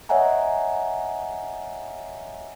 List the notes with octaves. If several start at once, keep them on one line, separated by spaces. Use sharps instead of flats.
C#5 D#5 E5 F#5 G#5 A#5